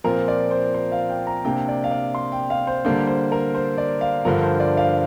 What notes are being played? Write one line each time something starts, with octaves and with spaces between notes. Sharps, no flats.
A#2 F3 C4 A#4
D5
C5
C5
F5
G5
A#5
C3 A#3 D4 G5
D5
F5
D5
C6
G5
F5
C5
D3 G3 A#3 D4 C5
C5
A#4
C5
D5
F5
G2 D3 F3 A#4
C5
D5
F5